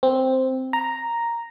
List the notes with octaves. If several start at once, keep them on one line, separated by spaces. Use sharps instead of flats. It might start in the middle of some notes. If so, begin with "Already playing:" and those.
C4
A#5